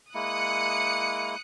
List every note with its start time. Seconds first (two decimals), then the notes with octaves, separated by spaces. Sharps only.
0.14 G#3 A#3 E4 D#6 F#6 C#7